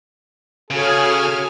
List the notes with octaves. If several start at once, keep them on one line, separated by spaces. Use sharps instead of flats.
C#3 F#4 G#4 A4 C#5 G#5 F6